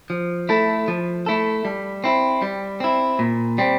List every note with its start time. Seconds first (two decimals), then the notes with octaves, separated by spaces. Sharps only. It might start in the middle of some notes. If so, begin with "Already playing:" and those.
0.10 F3
0.49 A3 E4 A4
0.88 F3
1.26 A3 E4 A4
1.65 G3
2.04 C4 E4
2.42 G3
2.80 C4 E4
3.19 A#2
3.58 G3 C4